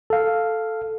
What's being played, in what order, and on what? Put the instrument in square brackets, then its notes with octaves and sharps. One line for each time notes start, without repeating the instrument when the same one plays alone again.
[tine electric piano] A4 F5